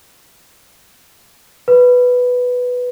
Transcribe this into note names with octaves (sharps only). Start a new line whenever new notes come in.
B4